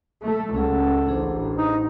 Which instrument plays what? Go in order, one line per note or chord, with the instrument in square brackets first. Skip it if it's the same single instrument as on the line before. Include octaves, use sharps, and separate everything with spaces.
[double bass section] A3 [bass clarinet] A4
[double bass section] C#2 [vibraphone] C#4 G#4 F#5
[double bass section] A1 [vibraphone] D4 G#4 C5
[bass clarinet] D#4